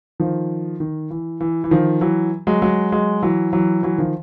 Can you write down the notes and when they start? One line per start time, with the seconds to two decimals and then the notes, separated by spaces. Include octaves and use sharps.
0.20 D#3 F3
0.80 D#3
1.10 E3
1.41 E3
1.64 E3
1.71 D#3 F3
2.01 E3 F#3
2.47 F#3 G#3
2.62 F#3 G#3
2.92 F#3 G#3
3.22 E3 F#3
3.53 E3 F#3
3.83 E3 F#3
3.98 D#3 F3